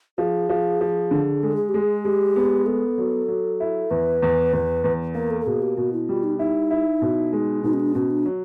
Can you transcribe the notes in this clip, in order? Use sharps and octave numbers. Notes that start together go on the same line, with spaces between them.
F3 G#4
F3
F3
D3
G#3 A4
G#4
G4
G#3
G#4
G#3 G4
B3
B3 A4
F#3
F#3
E4
E2 B4
E2
E2
E2
A#3 A#4
A4
A4
B2 G#4
G4
B2 F#4
E4
G3 F4
D#4
D#4 E4
E4
B2
G#3
B2 D#4
C#4
D4
B2 C#4
D4
F#3